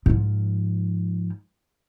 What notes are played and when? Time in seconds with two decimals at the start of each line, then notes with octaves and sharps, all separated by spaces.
0.06 G#2 F3